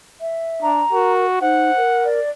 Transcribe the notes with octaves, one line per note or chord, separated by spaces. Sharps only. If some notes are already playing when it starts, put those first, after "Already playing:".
E5
D4 A#5
F#4 A#4
D#4 C5 F#5
A#4
D5